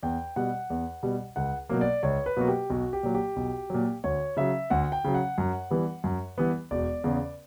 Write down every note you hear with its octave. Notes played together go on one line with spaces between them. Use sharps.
E2 G5
B2 G3 F#5
E2
B2 G3
C#2 F#5
B2 F#3 A#3
D5
C#2 C#5
B4
B2 F#3 A#3 F#4
G4
B1 F#4
G4
A#2 F#3
G4
B1
A#2 F#3
D2 C#5
C#3 F#3 E5
D2 F#5
G5
C#3 F#3
F#5
F#2
E3 G3 B3
F#2
E3 G3 B3
E1 D5
E2 C#3